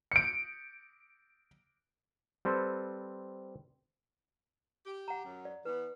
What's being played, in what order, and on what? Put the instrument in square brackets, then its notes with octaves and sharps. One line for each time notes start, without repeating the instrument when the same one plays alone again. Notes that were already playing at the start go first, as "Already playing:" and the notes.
[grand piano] C#7 D7
[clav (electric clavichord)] G3 C4 A4 B4 C5
[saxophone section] G4
[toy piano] F#5 A#5
[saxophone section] F#2
[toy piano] D5
[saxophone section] E3 B3 [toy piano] B4